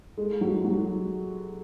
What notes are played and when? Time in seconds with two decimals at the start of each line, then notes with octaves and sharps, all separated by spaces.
0.18 G#3
0.41 F#3
0.65 F#3